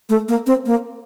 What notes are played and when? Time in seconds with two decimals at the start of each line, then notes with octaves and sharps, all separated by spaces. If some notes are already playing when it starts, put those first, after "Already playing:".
0.09 A3
0.29 A#3
0.47 C4
0.66 A#3